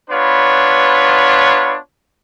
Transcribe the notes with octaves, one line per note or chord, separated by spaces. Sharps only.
B3 D4 F4 B4 C#5